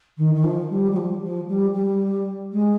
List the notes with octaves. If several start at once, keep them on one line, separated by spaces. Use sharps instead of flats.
D#3
D#3
F3
G3
G3
F3
F3
G3
G3
G#3